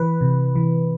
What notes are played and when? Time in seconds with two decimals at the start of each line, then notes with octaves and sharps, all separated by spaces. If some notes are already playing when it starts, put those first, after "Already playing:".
Already playing: E3 B4
0.21 C3
0.56 E3